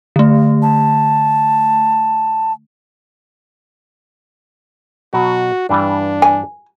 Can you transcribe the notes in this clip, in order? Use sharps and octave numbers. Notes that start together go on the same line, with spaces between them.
D3 A3
A5
B2 F#3 F#4
G2 E3 G3 D4
G#5